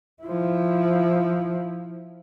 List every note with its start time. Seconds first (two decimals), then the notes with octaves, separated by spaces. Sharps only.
0.23 F3 E4